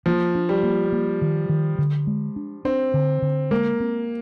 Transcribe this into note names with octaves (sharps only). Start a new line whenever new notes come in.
F3 A#3
D4
G3
A#3
A#3
D#3
D#3
D3
G#3
D4
C4 D4
D3
D3
G#3 A#3
C4